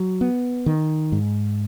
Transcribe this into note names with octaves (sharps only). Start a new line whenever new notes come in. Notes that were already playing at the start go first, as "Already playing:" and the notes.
Already playing: F#3
B3
D#3
G#2